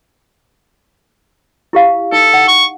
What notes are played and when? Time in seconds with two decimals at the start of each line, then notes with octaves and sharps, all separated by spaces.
1.73 E4 G4 F5
2.12 D#4 A4
2.34 F#5
2.48 C#6